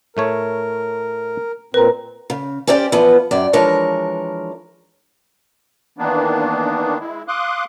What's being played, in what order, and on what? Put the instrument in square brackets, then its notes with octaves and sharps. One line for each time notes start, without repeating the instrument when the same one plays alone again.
[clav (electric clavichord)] A2 A3 C#5 [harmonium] A#4
[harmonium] A#2 C4 [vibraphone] A#4 A#5 [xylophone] B4
[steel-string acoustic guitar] C#3
C#4 G4 C5 D5 G5
E3 F3 B3 F4
F#2 D5 G5
E3 F3 G#3 D4 A#4 C#5
[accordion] D#3 E3 A#3 B3 D4
G#3 E4
F5 C6 D6 D#6 F#6